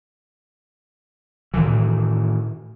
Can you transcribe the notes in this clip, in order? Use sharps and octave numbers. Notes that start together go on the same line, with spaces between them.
A2 C3 D#3 E3